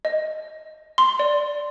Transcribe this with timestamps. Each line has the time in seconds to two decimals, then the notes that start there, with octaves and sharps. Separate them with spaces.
0.05 D#5
0.98 C6
1.19 D5